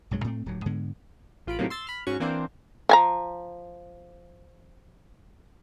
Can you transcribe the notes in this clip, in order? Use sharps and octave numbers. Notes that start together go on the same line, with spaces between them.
B1 G2 F#3 G#3
A2 A3 C4
D1 D#2 F#3
G#2 D3 G#3 B3
A1 F4 B5 D7
A2 C3 D#3 F#3 A#3
C6 E6 A6
B5 F6
G#2 C#4 F#4 C#6
E3 A#3 C4 D4 C5
F3 G#5 A#5